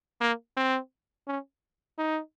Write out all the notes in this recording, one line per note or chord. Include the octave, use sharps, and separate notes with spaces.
A#3
C4
C#4
D#4